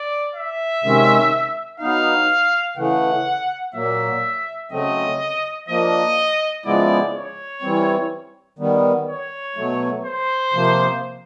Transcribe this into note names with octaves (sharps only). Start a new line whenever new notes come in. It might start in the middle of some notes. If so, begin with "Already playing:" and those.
Already playing: D5
E5
C3 D#3 G#3 C#4
F#3 B3 D#4 F5
C#3 E3 A3 F#5
A#2 F#3 A#3 E5
C#3 F#3 A3 C4 D#5
F3 A#3 D4 D#5
C#3 F3 G#3 B3 E4 D5
C#5
E3 G3 C4
D#3 G3 B3
C#5
B2 F#3 A3
C5
C3 F3 A#3